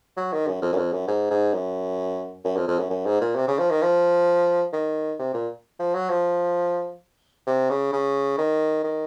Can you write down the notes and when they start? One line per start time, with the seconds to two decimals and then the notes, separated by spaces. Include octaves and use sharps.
0.17 F#3
0.32 D#3
0.47 F#2
0.62 F2
0.72 F#2
0.77 F2
0.93 F#2
1.08 G#2
1.31 G#2
1.54 F#2
2.45 F#2
2.57 F2
2.68 F2
2.79 F#2
2.90 F#2
3.06 G#2
3.21 A#2
3.36 C3
3.48 C#3
3.58 F3
3.70 D#3
3.82 F3
4.73 D#3
5.19 C3
5.34 A#2
5.79 F3
5.94 F#3
6.09 F3
7.47 C3
7.70 C#3
7.92 C#3
8.38 D#3
8.84 D#3